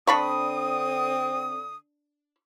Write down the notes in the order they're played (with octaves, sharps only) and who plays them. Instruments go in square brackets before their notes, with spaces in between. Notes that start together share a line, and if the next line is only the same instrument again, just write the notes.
[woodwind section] D3 D#6 [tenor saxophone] C4 [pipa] D4 B5 C#6